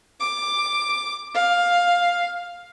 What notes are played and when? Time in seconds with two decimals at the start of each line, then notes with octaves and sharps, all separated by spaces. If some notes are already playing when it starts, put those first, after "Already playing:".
0.20 D6
1.35 F5